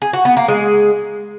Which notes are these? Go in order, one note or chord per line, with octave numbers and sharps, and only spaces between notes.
G#4
F#4
B3
A#3
G#3